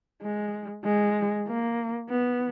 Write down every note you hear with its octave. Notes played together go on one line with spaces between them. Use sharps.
G#3
G#3
A#3
B3